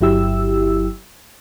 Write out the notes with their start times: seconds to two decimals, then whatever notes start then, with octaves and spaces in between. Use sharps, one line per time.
0.01 G1 F#3 E4 G4 E6